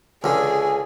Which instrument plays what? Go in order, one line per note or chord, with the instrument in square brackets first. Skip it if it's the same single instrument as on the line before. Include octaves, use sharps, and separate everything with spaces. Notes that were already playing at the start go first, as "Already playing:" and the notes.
[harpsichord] C#2 D3 [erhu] G#4